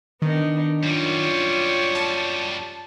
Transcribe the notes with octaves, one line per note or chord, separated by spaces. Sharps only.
D#3 B3 D4 D#4
F#2 G3 F4 C#5 D5
A5